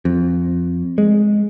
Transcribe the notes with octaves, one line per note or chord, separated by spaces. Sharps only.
F2
G#3